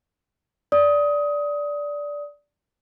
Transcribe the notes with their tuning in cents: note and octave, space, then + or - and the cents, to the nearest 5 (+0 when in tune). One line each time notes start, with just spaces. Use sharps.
D5 -10 D#6 +20